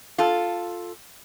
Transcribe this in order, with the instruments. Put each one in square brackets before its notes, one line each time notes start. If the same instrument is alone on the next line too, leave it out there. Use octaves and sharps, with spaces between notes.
[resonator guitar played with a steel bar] F4 A4